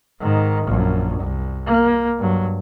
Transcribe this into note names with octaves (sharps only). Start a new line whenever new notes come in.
G#2 D#3
A#1 F#2
C2
A#3
G2 F#3